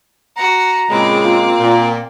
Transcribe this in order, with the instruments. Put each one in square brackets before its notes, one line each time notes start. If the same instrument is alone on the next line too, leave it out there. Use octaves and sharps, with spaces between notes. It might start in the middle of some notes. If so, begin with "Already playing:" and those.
[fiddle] F#4 F#5 [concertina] A#5
[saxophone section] A#2 C#3 G#3 [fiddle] C4 D6 [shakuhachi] B5
[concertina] A#3 [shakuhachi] F4
[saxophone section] A#2